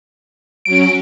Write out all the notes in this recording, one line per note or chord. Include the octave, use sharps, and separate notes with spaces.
F#3 C#4 D7